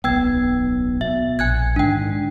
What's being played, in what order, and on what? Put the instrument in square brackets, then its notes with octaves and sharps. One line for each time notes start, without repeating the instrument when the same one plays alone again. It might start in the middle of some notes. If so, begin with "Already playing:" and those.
[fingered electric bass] D1 B1 B3 [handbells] G5 E6 G#6
[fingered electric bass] B2 [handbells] E5
[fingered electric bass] A#1 [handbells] G#5 F#6 G#6
[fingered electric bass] G#2 D3 D#3 [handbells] D4 G5